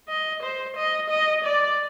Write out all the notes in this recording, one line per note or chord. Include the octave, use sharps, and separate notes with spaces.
D#5
C5
D#5
D#5
D5